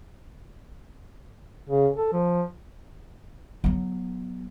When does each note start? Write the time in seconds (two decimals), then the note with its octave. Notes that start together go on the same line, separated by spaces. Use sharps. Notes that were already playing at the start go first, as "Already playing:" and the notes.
1.69 C#3
1.96 A4
2.13 F3
3.64 F#3 B3